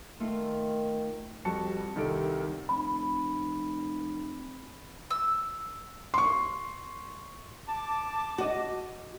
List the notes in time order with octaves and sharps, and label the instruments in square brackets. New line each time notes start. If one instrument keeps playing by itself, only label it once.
[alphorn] D#3 [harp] A3 F4
[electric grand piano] F2 G3 F#4 A5 C#7
C2 D#3 G4 A4 D7
[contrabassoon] F1 [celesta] B5
[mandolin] E6
[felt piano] C6 C#6
[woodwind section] A5 D6
[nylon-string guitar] F#4 D#5